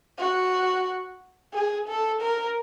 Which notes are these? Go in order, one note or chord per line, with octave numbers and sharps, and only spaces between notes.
F#4
G#4
A4
A#4